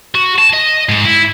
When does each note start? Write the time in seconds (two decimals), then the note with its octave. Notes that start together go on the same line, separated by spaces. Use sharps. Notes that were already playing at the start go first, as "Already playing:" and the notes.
0.15 F#4
0.39 A5
0.53 D#5
0.89 G#2
1.05 E4